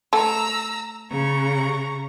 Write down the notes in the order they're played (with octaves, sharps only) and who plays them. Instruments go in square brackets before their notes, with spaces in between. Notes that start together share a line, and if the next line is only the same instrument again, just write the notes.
[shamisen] A3 [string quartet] A#5 E6
[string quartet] C#3 A#5 C#6